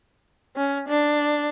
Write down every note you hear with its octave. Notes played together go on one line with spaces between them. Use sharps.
C#4
D4